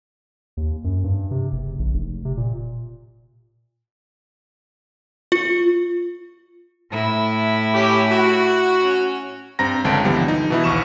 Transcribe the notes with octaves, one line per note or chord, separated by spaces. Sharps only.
D#2
F#2
G2
C3
F#1
A#1
F1
C3
A#2
F4
A2 E4
C#4 G4
F#4
C#4
G2 C4 A#5 A#6
G1 C#2 D3 A5 D7
D3 E3 F3 G3 B3
D#4
B2 E3 E4
A#1 D#2 C#6 E7